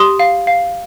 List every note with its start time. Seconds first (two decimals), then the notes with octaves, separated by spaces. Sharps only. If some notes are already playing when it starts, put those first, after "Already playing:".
Already playing: G4 C6 D#6
0.19 F5
0.47 F5